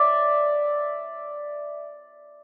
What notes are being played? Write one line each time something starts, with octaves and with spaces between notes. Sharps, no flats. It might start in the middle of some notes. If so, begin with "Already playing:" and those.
Already playing: D5 E5